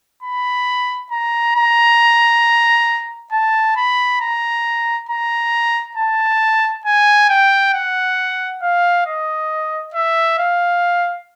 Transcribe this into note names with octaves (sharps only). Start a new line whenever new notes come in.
B5
A#5
A#5
A5
B5
A#5
A#5
A5
G#5
G5
F#5
F5
D#5
E5
F5